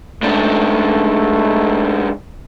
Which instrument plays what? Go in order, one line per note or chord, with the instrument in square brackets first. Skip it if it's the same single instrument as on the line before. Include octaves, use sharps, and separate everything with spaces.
[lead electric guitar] G#2 D4 [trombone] A3